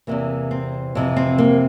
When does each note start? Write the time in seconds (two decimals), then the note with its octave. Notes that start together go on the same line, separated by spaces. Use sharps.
0.07 E2 C3 E3 A#3
0.51 C4
0.95 F2 C3 E3
1.16 C4
1.38 A#3